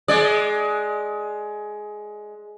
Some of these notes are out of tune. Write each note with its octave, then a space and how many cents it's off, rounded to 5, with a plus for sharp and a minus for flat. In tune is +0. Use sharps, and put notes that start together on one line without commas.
G#3 +15 D5 +10